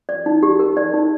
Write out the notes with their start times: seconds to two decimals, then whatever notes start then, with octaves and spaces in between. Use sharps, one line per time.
0.09 D5
0.26 D#4
0.43 G4
0.59 A#4
0.77 D5
0.93 D#4